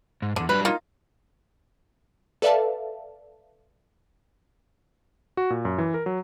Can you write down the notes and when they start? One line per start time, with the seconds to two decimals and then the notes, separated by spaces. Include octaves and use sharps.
0.22 G#2
0.36 E2 G2 D3
0.49 F#3 G3 D4 B4
0.65 A#3 D#4 F4
2.42 A4 B4 D5 E5 F5 A5
5.37 F#4
5.50 A#2
5.65 F#2
5.78 E3
5.94 A#4
6.06 F#3